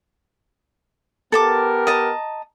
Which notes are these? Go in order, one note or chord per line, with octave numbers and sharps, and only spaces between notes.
B3 G4 A4 A#4 A5 D6
D#5 A5 A#5